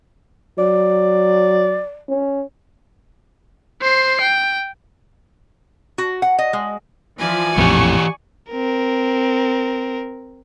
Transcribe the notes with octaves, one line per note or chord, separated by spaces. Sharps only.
F#3 D5
C#4
C5 C7
G5
F#4
F#5
D#5
G#3
E3 F3 D5 G#5
A#1 F2 A2 E3 G4 C#6
C4 A#4